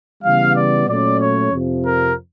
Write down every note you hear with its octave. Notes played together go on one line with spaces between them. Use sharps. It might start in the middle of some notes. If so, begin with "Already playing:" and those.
C#3 E3 G3 B3 F5
D5
A#2 F#3 A3 C#4 D5
C#5
F2 C3 F3
A#4